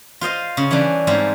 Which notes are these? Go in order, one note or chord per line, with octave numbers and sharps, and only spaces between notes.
F4 C5 D#5 F5
C#3
E3 G3 C#4 D4
G#2 G3 C4 E4 F4